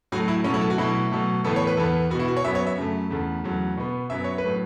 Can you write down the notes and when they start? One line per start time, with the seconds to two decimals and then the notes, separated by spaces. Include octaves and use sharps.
0.12 A2 F#3 A3 F#4
0.28 E4
0.44 B2 F#3 A3 C#4
0.54 E4
0.61 A4
0.70 F#4
0.78 B2 F#3 A3 E4
1.11 B2 F#3 A3
1.44 A2 E3 B3 A4
1.56 C#5
1.67 B4
1.77 E2 E3 B3 A4
2.10 B3 F#4
2.15 B2 E4
2.28 F#4
2.37 C#5
2.44 F#2 F#3 B3 E5
2.55 C#5
2.67 E5
2.78 F#2 C#3 A3
3.10 E2 C#3 A3
3.44 E2 C#3 F#3 A3
3.77 B2 B3
4.10 F#2 F#3 B3 E5
4.24 C#5
4.38 B4
4.44 A2 F#3 A3